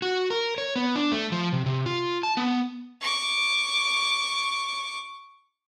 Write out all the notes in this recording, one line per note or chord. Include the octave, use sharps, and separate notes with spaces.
F#4
A#4
C#5
B3
D4
A3
F3
C3
C3
F4
A5
B3
C#6 D6